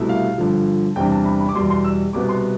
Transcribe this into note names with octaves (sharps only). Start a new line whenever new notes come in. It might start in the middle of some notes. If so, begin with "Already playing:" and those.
Already playing: C2 B2 A3 E4
F5
G2 D3 F3
E2 C3 G3 D4 G5
A5
B5
B5
D6
E2 B2 G3 C6
C6
E6
C2 B2 B3 D6
C6